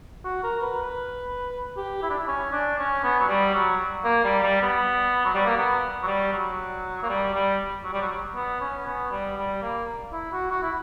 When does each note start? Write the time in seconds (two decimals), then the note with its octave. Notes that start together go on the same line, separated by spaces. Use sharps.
0.24 F#4
0.43 A#4
0.62 B4
0.82 B4
1.77 G4
2.02 E4
2.10 D4
2.18 E4
2.27 C#4
2.52 D4
2.78 C#4
3.03 B3
3.20 F#3
3.28 G3
3.54 F#3
4.04 A#3
4.24 G3
4.42 G3
4.62 B3
5.25 F#3
5.35 G3
5.46 A#3
5.56 B3
6.03 F#3
6.07 G3
6.32 F#3
7.03 A#3
7.09 G3
7.34 G3
7.84 F#3
7.93 G3
8.01 F#3
8.36 B3
8.61 C#4
8.86 B3
9.11 G3
9.37 G3
9.62 A#3
10.12 E4
10.32 F#4
10.51 F#4
10.62 E4